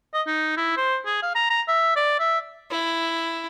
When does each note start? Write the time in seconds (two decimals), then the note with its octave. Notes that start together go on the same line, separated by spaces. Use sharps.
0.14 D#5
0.27 D#4
0.57 E4
0.77 C5
1.06 G#4
1.23 F5
1.35 A#5
1.50 A#5
1.68 E5
1.96 D5
2.19 E5
2.71 E4